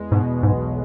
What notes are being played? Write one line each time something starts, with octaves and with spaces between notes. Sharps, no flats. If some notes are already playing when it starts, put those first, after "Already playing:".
Already playing: E2 G#3
G#2 B2
B1 G#2